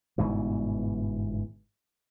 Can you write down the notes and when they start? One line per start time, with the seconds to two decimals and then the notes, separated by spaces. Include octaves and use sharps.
0.18 G1 G#2 B2 E3